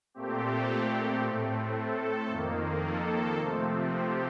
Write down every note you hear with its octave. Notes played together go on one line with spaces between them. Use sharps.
A#2 A3 C4 G4
A2 A3 C4
A4
F2 D#3 A#3
A4
C3 F3 A3 C4
G4